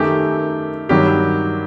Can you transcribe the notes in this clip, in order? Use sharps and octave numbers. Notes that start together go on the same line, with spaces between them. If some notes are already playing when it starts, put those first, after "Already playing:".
Already playing: F#2 D#3 A3 G4
G2 D#3 F#3 G4